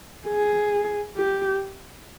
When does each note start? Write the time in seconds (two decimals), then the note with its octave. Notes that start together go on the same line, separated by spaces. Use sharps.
0.28 G#4
1.17 G4